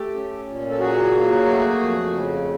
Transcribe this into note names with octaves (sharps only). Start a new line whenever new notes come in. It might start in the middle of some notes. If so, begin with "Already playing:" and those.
Already playing: A3 G4 A4
C#4
A#2
A4
F#3 F#4 G#4
A#3
A3
F2
C#3